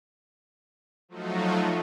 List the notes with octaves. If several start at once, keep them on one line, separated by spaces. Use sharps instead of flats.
F3 F#3 A3 D#4 F4 F#4